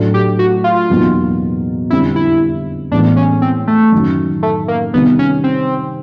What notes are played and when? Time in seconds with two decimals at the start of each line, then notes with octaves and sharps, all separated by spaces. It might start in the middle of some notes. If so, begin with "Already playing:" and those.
Already playing: A2 F#3 A3 D4
0.14 G4
0.39 F#4
0.64 F4
0.89 E2 B2 F#3 A#3 D#4
1.90 F2 D3 G3 C4 E4
2.16 E4
2.91 A2 E3 G#3 B3 D4
3.16 C#4
3.42 C4
3.67 A3
3.92 F#2 D#3 F#3
4.43 A3
4.68 A#3
4.93 C3 D#3 G3 B3
5.19 C#4
5.44 C4